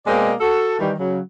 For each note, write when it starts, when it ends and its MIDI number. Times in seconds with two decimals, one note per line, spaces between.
0.07 0.33 47
0.07 0.33 56
0.07 0.33 58
0.07 0.33 60
0.07 0.33 74
0.07 0.33 75
0.41 0.77 66
0.41 0.77 69
0.79 0.93 51
0.79 0.93 52
0.79 0.93 55
0.99 1.19 49
0.99 1.19 54